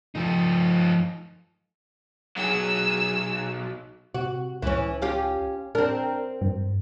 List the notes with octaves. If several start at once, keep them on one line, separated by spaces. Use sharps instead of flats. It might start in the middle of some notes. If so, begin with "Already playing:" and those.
F3 D#4
B1 F#3 G#4 E6
C3 F#4
C#2 E3 C#4
C#4 F4 G4
C4 D4 A#4
G2